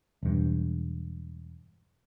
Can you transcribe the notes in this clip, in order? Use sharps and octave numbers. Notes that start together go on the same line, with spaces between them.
E1 G2